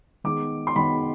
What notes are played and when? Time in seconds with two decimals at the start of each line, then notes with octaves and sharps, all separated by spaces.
0.24 D#3 G#3 B3 D6
0.67 C6
0.76 D#3 G#3 B3 B5